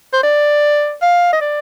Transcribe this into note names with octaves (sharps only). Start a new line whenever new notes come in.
C5
D5
F5
D#5
D5